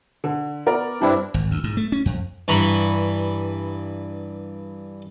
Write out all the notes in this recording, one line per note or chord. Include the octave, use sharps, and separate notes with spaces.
D3
B3 A#4 D5
G2 C4 D4 E4
G#1
D2
G#2
A3
C#4
F2
G2 E3 A#5 B5 C#6